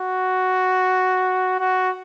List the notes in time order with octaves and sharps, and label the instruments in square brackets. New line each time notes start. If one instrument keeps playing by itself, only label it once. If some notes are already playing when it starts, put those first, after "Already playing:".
Already playing: [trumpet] F#4
F#4